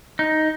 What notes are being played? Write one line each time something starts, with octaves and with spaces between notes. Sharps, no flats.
D#4